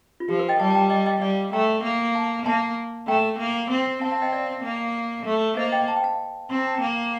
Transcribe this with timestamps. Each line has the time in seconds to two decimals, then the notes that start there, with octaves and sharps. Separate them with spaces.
0.20 F4
0.29 F3 G4
0.39 A#4
0.49 D#5 G5
0.59 G3 F5 A5
0.71 A5
0.75 G5 A#5
0.90 D#5 G5
1.06 D#5 G5
1.21 G3 D5 F5
1.53 A3 G5 A#5
1.83 A#3
2.15 F5 A5
2.45 A#3 A5 C6
3.08 A3 G5 A#5
3.39 A#3
3.70 C4
4.01 C4 F5 A5
4.12 F5 A5
4.22 D#5 G5
4.33 D5 F5
4.64 A#3
5.26 A3
5.57 A#3 C5 D#5
5.72 D#5 G5
5.88 A5
5.96 G5
6.04 F5 A5
6.50 C4 C6
6.58 A#5
6.67 A5
6.75 G5 A#5
6.81 A#3